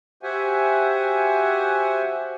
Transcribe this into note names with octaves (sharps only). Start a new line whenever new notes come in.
F#4 G4 C5 E5 F#5 G#5